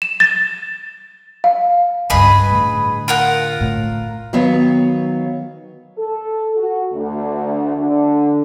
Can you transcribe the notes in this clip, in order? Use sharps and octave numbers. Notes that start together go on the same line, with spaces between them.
E7
A6
F5
C#2 G2 G#4 B4 D#5
A2 D3
F4 A#4 F#5
A2
D#3 F#3 B3 C#5 F5
A4
F#4
D2
D3